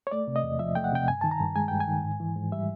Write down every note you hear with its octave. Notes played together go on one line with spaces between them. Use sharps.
C#5
A3 D5
C3
D#5
E2
F3 E5
A3 G5
F#5
C3 G5
G2 G#5
D#3 A5
A#5
G2
G#3 G#5
G2 G5
G#5
D#3
G#2
E3
G#2
G3 E5